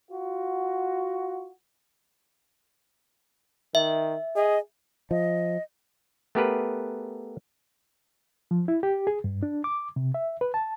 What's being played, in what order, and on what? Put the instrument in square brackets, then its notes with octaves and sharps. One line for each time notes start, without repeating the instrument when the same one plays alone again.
[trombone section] F4 F#4
[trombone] D#3 [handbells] E5
[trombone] G#4 [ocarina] D#5
[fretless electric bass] F3 [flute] D#5
[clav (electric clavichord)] A3 B3 G4 G#4 A#4 B4
[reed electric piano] F3
E4
G4
G#4
G2
D4
D6
C3
E5
B4
A5